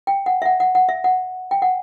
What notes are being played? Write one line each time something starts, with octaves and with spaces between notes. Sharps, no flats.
G5
F#5
E5
F#5
F#5
F#5
E5
F#5
G5
F#5